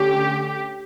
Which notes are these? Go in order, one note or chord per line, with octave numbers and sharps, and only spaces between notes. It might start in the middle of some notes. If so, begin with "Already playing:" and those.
Already playing: D3 A3 C#4 G4